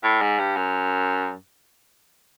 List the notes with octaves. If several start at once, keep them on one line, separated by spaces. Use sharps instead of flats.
A2
G#2
G2
F#2